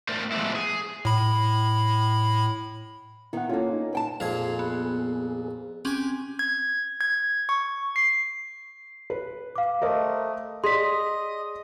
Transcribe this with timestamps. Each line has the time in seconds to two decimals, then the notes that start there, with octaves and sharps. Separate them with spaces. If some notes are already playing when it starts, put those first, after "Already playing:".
0.08 A3 A#4 C5 D5
0.32 F3 G#3 A3 B3 D4 E4
0.55 G#4
1.05 A2 B5
3.33 D#3 B3 E4 F#5
3.49 A#3 C#4 F4 A4
3.72 D#4
3.93 B4 G5 A5
4.20 F2 A#2 G#4 G#6 C7 F7
4.59 B3
5.85 C4 C#4 G4 G#5
6.39 G#6
7.01 G#6
7.49 C#6
7.96 C7
9.10 B4
9.56 F5 D6
9.82 A3 A#4 C5 D#5
10.64 G#4 D5 D#5 C6 D#6 B6